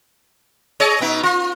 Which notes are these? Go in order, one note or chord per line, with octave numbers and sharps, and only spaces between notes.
G#4 C#5 D#5
B2 B3 D#4
F4